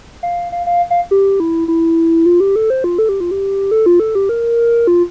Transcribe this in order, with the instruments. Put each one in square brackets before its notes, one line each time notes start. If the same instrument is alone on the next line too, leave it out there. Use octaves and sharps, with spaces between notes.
[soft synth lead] F5
F5
F5
F5
G4
E4
E4
F4
G4
A4
C5
F4
A4
G4
F4
G4
A4
F4
A4
G4
A#4
F4